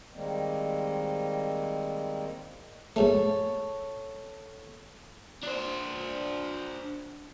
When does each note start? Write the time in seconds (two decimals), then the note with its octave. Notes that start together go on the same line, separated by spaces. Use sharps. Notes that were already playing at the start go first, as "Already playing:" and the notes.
0.13 D#3 G3 G#3 A#3 C4
2.96 A#1 G#2 A3 A4 C#5
5.43 D4 C5